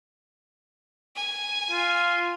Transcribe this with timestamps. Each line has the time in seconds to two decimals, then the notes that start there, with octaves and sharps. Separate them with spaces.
1.16 G#5
1.71 F4